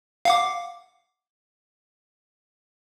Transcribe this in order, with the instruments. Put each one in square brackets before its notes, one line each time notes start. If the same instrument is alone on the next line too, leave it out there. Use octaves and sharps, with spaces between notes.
[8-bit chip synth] F5 F#5 D6